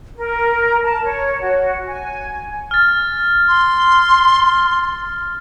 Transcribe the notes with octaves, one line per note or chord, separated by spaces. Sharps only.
A#4
A5
C#5
F#4
G#5
F6 A6
C6